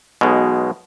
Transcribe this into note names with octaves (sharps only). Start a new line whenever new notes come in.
B1 B2 G#3